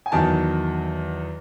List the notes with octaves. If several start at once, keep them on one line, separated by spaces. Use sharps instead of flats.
G#5
E2 D#3 F#3 A5